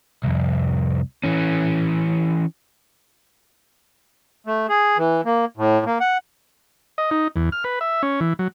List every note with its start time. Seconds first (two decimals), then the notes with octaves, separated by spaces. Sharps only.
0.24 C2 F2
1.24 E3 C#4
4.47 A3
4.69 G#4
4.98 E3
5.25 A#3
5.57 A2
5.86 A#3
6.00 F#5
6.98 D#5
7.11 D#4
7.36 E2
7.52 F6
7.64 B4
7.81 E5
8.03 C#4
8.21 E3
8.39 F#3